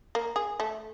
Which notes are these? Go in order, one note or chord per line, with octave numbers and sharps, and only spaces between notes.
A#3
G#4
A3